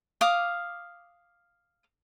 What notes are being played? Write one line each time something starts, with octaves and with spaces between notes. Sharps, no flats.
F5 D6 D#6